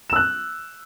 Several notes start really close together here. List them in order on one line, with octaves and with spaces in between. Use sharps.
E7 E6 F#6